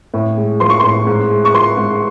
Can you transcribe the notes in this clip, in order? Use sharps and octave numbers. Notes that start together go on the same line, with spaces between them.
A2
G#3
F3 C6
C#6
A2 C6
G#2
G#3
C#6
F3 C6
G#2